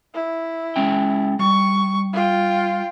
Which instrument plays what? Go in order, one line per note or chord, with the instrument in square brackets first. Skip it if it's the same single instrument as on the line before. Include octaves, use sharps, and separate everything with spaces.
[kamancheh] E4
[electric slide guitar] G#3 C#4 G5
[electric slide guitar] G3 [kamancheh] C#6
[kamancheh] F4 G5